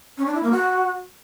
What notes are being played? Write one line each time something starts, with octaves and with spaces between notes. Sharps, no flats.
C#4
D4
E4
A#3
F#4